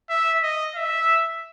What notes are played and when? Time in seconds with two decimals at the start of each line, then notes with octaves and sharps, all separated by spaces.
0.09 E5
0.43 D#5
0.75 E5